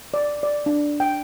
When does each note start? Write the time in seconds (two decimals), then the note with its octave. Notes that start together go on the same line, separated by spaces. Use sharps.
0.14 D5
0.43 D5
0.66 D4
1.00 G5